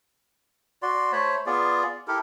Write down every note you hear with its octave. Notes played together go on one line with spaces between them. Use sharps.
F#4 D5 C6
A3 C5 C#5 B5
B3 F4 G#4 D5
E4 G4 A4 A#4